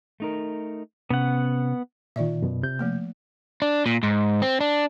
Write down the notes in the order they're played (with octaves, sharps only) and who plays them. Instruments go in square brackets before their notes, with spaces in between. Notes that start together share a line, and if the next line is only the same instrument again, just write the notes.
[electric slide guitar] A3 D#4 A#4
[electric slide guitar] C3 C#4 [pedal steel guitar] B3 F#5
[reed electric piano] A#2 D#3 [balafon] F4 D5 E5
[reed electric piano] F#2 B2
C3 G6
[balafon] F3 A3 A#3
[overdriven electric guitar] D4
A#2
G#2
C4
D4